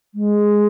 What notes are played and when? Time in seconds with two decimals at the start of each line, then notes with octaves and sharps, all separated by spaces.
0.14 G#3